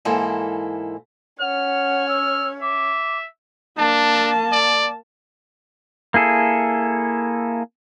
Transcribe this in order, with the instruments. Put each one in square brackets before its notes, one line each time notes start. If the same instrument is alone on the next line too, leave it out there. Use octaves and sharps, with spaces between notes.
[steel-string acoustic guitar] G#2 E3 A#3 E4 A4 C5
[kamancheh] C#4 C#5 [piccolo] F#5 [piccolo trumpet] F6
[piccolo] E6
[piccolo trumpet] E5 [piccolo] D6
[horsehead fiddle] A#3 A5 [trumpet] D4
[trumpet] D5
[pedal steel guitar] A#3 E4 G#4 A4